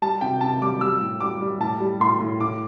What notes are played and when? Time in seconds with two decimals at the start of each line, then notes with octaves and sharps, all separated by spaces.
0.02 G3 A5
0.21 C3 G5
0.41 C3 A5
0.62 G3 D6
0.81 G3 E6
1.01 A2
1.20 G3 D6
1.41 G3
1.60 A2 A5
1.80 G3
2.00 A2 C6
2.20 A2
2.40 A2 D6